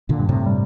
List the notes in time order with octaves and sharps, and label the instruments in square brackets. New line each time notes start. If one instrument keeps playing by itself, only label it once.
[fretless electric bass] A#2 D3
[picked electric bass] G2
[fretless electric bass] A2 C3
[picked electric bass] G3